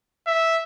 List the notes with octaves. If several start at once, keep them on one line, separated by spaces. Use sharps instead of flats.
E5